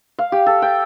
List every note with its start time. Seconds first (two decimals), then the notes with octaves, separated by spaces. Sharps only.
0.19 F5
0.32 G4
0.46 A4
0.62 G5